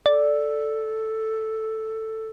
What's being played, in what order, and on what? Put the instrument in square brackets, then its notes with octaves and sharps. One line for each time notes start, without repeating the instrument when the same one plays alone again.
[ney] A4 [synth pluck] D5